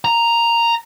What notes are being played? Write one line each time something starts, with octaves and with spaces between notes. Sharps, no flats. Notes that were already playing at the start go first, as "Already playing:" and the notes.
A#5